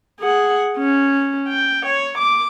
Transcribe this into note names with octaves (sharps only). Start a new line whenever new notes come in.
G#4 F#5
C#4
G5
C#5
D6